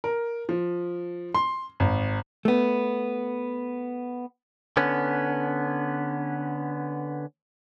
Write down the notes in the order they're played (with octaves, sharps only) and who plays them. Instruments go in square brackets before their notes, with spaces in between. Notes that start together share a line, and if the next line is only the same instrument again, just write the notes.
[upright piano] A#4
F3
C6
G#1
[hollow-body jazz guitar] A3 B3
[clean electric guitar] D3 B3 C#4